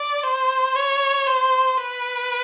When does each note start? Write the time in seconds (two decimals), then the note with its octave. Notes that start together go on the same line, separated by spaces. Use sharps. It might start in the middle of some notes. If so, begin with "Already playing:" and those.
Already playing: D5
0.23 C5
0.75 C#5
1.27 C5
1.77 B4